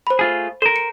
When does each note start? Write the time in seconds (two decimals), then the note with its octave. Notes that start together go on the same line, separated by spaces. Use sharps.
0.07 C5 B5
0.19 A3 F4 G#4
0.62 A4 A#4 C5
0.76 C#7